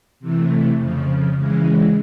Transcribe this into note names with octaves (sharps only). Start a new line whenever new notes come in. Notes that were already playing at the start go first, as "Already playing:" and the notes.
C3 E3 A3
F2 C#3 F3
C#3 E3 G#3